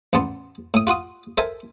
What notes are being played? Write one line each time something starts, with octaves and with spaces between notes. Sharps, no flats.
A1 E2 B3 A5 C6
A2 D#6
F4 F#4 C6 D#6
A4 A#4 C5 E5 G#5